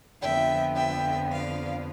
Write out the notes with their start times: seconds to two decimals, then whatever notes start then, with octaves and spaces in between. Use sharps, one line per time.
0.21 F2 D3 F3 B3 E5 G5
0.76 E5 G5
1.31 D5 F5